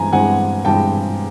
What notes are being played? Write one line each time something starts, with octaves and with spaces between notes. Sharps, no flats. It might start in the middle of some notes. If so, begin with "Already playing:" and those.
Already playing: G2 E3 G#3 C4 G#5 A#5
G2 E3 G#3 C4 F#5 G#5
G2 E3 G#3 C4 G5 A5